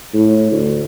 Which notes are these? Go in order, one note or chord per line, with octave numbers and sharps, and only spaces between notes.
A2
D2